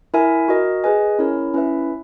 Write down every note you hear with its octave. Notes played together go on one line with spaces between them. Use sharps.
E4 A#4 E5 G#5
F#4 A#4 D#5
G#4 B4 D#5 G#5
C#4 E4 A#4 C#5
C#4 E4 B4 E5